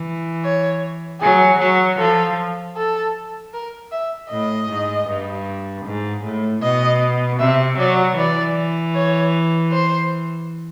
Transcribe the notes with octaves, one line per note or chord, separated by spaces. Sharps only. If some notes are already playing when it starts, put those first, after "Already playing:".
Already playing: E3
C#5
F#3 G#4
F#3
F3 A4
A4
A#4
E5
A2 D#5
G#2
G2
G#2
A2
B2 D#5
C3 E5
F#3 D5
E3 D5
C#5
C5